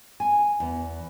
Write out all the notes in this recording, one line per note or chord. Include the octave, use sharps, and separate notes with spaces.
G#5
E2